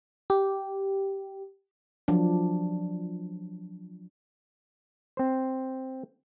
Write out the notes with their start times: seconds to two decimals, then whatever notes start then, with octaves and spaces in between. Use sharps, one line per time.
0.30 G4
2.08 F3 F#3 D4
5.17 C4 C5